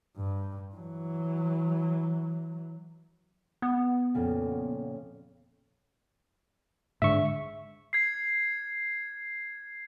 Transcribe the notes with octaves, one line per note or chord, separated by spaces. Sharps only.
G2
E3 F#3
B3
F2 A#2 C#3
G#2 D3 E5 C#6
G#6 C7